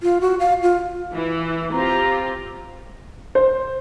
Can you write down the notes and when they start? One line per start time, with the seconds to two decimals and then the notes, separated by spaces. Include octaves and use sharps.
0.03 F4
0.21 F#4
0.39 F5
0.63 F4
1.13 E3
1.72 C4 F4 G4 A#5
3.35 C5